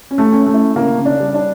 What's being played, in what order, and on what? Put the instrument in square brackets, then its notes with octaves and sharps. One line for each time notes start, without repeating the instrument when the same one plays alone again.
[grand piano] C#4
[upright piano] A3
[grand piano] C#4
[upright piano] A3
[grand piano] E4
[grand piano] C#3 [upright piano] A#3
[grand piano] C#3
[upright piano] D4
[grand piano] G3
[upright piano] D4